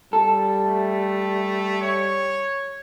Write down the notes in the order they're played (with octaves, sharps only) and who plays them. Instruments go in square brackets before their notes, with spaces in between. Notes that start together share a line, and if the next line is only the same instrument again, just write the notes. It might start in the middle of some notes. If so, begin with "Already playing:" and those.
[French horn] G3 [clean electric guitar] A4
[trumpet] A3
C#5